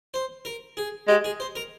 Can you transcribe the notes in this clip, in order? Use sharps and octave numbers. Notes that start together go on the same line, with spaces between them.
C5
A#4
G#4
G#3 G4
G#4
C5
A#4